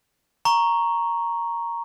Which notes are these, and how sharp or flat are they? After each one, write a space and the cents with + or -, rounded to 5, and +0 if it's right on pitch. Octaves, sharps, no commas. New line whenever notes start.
A#5 +0 C#6 +0